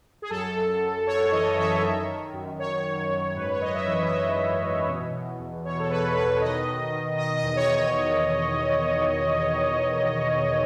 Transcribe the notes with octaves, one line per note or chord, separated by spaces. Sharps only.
G#4
F#2 A4
F#2
F#2
F#2 C#5
E3 D#5
F#2 E5
D#3
D#3
F#2
D#3 C#5
F#2
F#2
G#2 B4
C#5
G#2 D#5
E5
E3
E5
G#2 D#5
E3
E3
B2
B2
E2
B2 C#5
A4
E2 B4
B2 B4
D#3 D#5
D#3
D#3
D#3 D#5
D#5
E2
C#5
E2
C#5